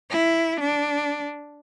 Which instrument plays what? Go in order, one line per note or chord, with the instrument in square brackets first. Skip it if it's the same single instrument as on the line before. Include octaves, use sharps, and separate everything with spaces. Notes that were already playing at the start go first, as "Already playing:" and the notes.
[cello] E4
D4